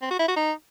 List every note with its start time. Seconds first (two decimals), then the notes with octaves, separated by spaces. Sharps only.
0.02 C4
0.10 F#4
0.19 E4
0.28 F#4
0.36 D#4